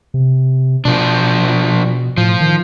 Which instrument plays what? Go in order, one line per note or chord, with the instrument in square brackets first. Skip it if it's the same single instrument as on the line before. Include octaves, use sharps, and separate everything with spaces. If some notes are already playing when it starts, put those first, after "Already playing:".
[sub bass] C3
[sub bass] B2 [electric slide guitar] F3 D4
[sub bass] A2 [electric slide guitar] F3
[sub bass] D#3